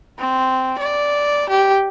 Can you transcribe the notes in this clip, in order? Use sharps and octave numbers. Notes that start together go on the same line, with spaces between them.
C4
D5
G4